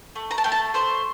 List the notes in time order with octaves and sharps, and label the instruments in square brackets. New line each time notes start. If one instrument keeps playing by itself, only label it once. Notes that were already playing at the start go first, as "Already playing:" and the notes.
[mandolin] A3
A#5
A5
A3 G5
A5
A3 C5